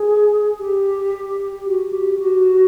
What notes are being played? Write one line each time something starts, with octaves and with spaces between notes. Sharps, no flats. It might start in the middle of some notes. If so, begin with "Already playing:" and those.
Already playing: G#4
G4
F#4
G4
F#4